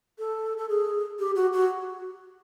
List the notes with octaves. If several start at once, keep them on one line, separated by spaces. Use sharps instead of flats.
A4
A4
G#4
G4
F#4
F#4